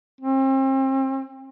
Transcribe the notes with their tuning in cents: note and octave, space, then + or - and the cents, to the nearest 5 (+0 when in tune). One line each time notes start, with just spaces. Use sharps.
C4 +35